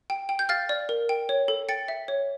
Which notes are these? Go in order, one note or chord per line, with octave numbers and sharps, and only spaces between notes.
G5
G5
G6
F5 F6 A6
D5
A#4
G5
C#5
A4
G5 A6 C#7
E5
C#5